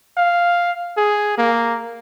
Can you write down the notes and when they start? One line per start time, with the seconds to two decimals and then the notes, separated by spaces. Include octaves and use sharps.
0.17 F5
0.97 G#4
1.38 A#3